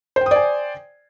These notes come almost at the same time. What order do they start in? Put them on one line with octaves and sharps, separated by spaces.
C5 G5 D#6 D5 G#5